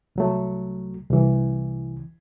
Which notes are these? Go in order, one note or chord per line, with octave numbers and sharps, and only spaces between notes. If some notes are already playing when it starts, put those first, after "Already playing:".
C2 F#3 A3
C2 E3